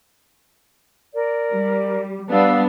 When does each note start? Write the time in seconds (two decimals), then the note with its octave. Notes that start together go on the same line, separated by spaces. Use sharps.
1.14 A#4 D5
1.54 G3
2.31 G3 B3 D4 F5 E6